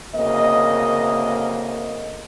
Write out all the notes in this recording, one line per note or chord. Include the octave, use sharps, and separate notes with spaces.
D2 C#3 A#3 C4 D#5